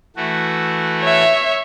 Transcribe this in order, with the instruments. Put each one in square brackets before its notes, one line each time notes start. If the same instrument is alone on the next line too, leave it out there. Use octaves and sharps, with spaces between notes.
[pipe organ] E3 A3 F#4
[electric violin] C#5 E5